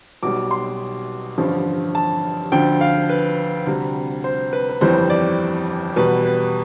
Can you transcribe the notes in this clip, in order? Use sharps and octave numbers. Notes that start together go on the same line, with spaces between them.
B1 B2 G3 D6
C6
A1 G2 D3 F3
A5
D2 D3 F3 G5
F5
B4
D2 C3 G3
C5
B4
B4
G1 F2 E3 G3 C5
D5
E2 B2 G3 B4
B4